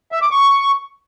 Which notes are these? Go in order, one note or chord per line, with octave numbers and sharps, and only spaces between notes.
E5
D6
C#6